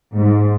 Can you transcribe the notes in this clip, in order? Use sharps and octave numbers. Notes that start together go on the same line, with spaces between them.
G#2